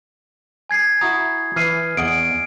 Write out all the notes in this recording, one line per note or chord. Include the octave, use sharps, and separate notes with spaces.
G#5 G#6 C7
E4 F#4 A#5 D#6
E3 F6 C7 D#7
E2 D#5 F#5 D7